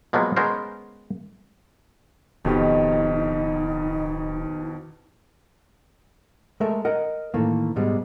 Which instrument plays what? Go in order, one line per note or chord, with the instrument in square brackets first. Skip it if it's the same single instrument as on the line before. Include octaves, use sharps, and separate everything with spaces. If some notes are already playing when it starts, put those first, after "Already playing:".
[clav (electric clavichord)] B2 F3 F#3 G#3 A#3 B3
G#3 B3 C#4 A#4 C5
[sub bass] D1 [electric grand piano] F2 B2 G4 [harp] D#3 [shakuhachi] D#4
[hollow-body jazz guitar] G#3 A3 A4 A#4 E5
A#4 D#5 F#5
A2 D#3 E3 A3 A#3
G#2 B2 G3 G#3